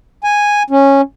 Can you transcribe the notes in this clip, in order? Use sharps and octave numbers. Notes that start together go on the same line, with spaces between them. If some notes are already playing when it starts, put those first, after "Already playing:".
G#5
C#4